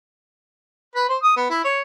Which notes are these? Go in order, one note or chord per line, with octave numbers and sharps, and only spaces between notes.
B4
C5
D#6
B3
E4
C#5